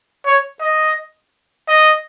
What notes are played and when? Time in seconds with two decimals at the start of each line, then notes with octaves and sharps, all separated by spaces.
0.26 C#5
0.61 D#5
1.68 D#5